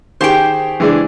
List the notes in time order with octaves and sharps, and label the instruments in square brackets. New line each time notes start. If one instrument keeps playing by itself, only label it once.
[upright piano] D#3 G4 G#4 [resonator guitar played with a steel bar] C5 G5
[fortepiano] E3 G#3 D4